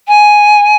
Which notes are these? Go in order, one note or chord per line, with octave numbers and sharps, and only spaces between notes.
G#5